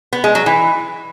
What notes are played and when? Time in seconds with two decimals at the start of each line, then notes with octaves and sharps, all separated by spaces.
0.13 B3
0.24 G#3
0.35 F#3
0.46 E3